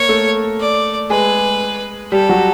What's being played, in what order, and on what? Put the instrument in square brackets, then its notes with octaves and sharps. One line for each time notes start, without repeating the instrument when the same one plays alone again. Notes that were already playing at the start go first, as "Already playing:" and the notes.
Already playing: [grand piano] A#3 [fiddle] C#5
[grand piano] A3 A4
[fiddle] D5
[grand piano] G#3 G#4 [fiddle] B4
[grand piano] G3 G4 [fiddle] A4
[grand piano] F#3 F#4